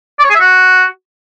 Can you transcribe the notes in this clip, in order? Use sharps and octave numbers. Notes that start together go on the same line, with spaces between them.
D5
C#5
G#4
E5
F#4